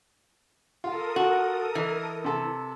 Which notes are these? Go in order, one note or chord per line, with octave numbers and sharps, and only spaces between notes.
F4 A4 A#4 F5 D#6
F#4
E3 D#5
C3 A4